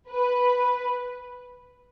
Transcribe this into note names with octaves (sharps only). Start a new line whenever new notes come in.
B4